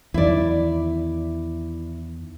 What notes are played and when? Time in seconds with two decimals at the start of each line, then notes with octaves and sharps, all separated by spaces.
0.14 E2 D#3 E4 D5